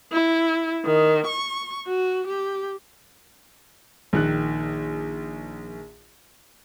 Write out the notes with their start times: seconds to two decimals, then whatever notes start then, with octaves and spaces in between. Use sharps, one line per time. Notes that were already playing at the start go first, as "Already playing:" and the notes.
0.12 E4
0.85 D#3
1.27 C#6
1.87 F#4
2.27 G4
4.13 A#1 D#3 F#6